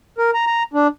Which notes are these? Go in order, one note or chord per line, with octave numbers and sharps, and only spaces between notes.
A#4
A#5
A#5
D4